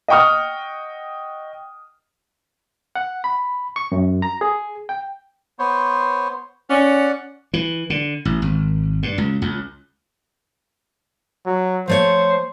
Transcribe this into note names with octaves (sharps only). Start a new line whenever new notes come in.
D#5 F#5 G5 C#6 D#6 F6
F#5
B5
C#6
F#2
A#5
G#4
G5
B3 C5 C#5
C#4 D5 F#5
E3
D3
A1
G#1
G2
C#2
C#2
F#3
F3 A3 C5 C#5